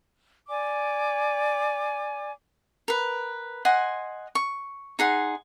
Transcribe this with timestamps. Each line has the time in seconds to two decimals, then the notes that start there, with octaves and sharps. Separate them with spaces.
0.48 D5 G#5 D6
2.88 A#4 B4
3.65 D#5 F#5 G#5 C6
4.35 C#6
4.99 D#4 G#4 F#5 C6